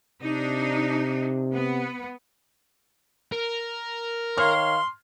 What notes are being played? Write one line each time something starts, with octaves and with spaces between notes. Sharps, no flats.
C3 D4 D#4
B3
A#4
D#3 C#5 F5 C6 F6